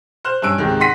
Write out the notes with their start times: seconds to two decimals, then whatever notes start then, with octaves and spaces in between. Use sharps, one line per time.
0.25 C5 F6 F#6 E7
0.42 G2 C#4 G#5 E6 F#6 D7
0.58 C#2 G#2 C3 D#3
0.80 F#5 C6 A#6 B6 D#7